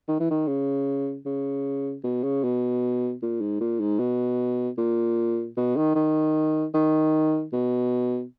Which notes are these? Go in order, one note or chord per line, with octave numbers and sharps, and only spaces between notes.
D#3
E3
D#3
C#3
C#3
B2
C#3
B2
A#2
G#2
A#2
G#2
B2
A#2
B2
D#3
D#3
D#3
B2